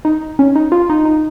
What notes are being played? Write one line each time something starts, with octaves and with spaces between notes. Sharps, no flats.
D#4
C#4
D#4
F4
D#4
D#4